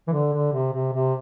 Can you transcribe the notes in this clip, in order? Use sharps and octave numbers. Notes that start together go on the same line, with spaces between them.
E3
D3
D3
C3
C3
C3